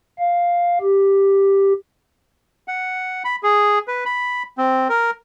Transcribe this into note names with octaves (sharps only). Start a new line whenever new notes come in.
F5
G4
F#5
B5
G#4
B4
B5
C4
A#4